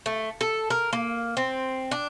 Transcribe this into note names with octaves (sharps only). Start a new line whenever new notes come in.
A3
A4
A#4
A#3
C4
D4